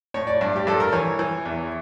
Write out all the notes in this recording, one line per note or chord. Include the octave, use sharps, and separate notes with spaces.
A2 C#5
D5
G2
G4
G2 A4
A#4
E3 C#5
E3
E2